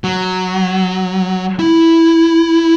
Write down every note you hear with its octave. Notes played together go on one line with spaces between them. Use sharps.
F#3
E4